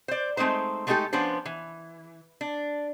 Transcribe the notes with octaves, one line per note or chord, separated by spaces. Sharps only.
C5 D5
G#3 A3 C4 D#4 C5
G#3 A3 B3 D#4 G4 A4
F3 B3 C#4 D4 C5
E3
D4